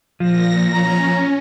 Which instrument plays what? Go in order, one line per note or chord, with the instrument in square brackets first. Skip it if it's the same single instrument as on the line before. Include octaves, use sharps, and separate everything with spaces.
[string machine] A#2 A#6 [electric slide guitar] F3
[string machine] C#4 [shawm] A#5